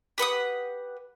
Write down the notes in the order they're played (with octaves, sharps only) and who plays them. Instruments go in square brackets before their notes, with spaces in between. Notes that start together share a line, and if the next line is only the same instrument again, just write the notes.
[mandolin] G4 B4 F#5 D#6